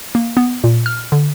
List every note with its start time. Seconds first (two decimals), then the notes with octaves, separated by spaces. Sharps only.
0.15 A#3
0.37 B3
0.64 A#2
0.86 F6
1.12 D3